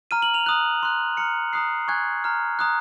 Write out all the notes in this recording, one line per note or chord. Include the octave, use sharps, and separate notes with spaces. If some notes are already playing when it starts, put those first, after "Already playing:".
A#5 F6 D#7
F#7
F7
A#5 D#6 F#6
C6 F#6
A#5 F6 C#7
A#5 D#6 F#6 C7
G#5 C#6 F#6 G#6
A#5 F6
A#5 D#6 F#6